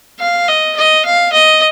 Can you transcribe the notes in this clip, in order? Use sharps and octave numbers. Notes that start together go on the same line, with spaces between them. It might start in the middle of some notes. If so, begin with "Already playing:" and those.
F5
D#5
D#5
F5
D#5